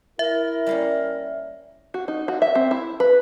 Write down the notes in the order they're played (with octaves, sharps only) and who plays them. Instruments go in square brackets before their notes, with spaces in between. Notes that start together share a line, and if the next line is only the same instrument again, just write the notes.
[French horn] E4 [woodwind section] A#4 [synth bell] E5
[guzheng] G3 A#3 C#4
[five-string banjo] F#4
D#4
F#4
E5
C4
E4
B4